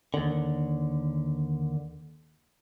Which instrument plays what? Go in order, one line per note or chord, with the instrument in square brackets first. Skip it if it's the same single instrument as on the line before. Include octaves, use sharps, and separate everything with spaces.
[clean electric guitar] D#2 D3